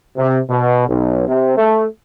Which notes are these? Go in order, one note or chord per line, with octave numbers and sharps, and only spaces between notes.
C3
B2
B1
C3
A3